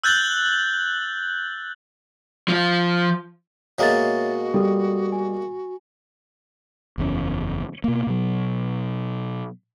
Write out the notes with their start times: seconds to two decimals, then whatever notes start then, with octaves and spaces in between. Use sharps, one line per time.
0.04 E6 F#6 G6 A6 F#7 G7
2.49 F3 F4
3.79 B2 G#3 A#3 F#4 C#5 E5 A6
4.54 G3 A4 D#6
5.12 G#5
6.98 F#1 E2 A#2 C#4
7.84 B2 A#3
8.07 B2 F#3